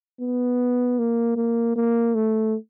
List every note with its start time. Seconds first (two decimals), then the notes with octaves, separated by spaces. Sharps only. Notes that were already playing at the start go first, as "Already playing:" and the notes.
0.21 B3
0.99 A#3
1.37 A#3
1.76 A#3
2.15 A3